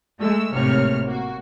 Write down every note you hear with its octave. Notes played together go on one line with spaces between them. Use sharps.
G#3 A3 E6
G#1 A2 C3 A#3 C#5 F6
A#3 F#4